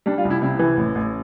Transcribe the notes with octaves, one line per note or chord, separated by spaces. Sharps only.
G3 D4
F4
C2
E4
C3 E4
E3
A1
A1